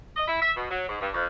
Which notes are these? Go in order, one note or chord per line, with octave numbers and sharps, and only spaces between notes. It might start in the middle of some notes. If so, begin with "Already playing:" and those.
D#5
E4
E5
B2
F#3
G#2
G2
F2